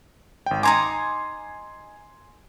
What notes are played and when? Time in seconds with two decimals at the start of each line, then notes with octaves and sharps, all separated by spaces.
0.46 G#1 G5
0.63 D#4 G#5 A#5 C6 D6 G#6